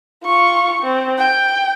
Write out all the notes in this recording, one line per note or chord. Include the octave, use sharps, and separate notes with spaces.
F4 C#6
C4
G5